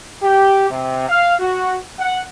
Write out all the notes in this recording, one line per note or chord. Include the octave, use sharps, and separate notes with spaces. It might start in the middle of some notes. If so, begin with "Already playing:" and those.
G4
C3
F5
F#4
F#5